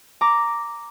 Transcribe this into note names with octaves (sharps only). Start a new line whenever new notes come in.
A#5 D6